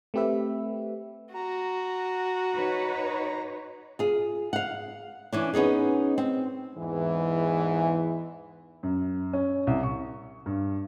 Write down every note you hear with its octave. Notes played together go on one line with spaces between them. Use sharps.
A3 C4 G4 B4 E5
F#4 A#5
D#4 B4 C#5
F4 G#4
F5 F#5
E3 C#4 D4
B3 C#4 D#4 G#4
C4
E2 G#2 E3
F#2
C#4
C2
C#6
G2